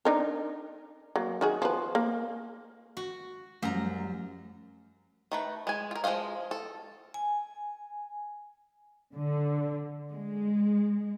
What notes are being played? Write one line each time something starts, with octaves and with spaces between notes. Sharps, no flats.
D4 D#4 A#4
F#3 A#3
D#3 F#4 G#4
F3 B4
A#3
F#4
F#2 F3 G3 A3 A#5
D#3 A3 B4
G#3 G#5
F4 A#4
F3 G#3 G#4 D#5 F5
A4
G#5
D3
G#3